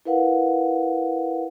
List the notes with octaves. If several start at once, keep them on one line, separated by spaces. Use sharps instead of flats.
E4 A#4 B4 F5 F#5